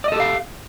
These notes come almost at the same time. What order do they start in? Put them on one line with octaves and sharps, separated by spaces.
D5 D#5 A4 G4 F5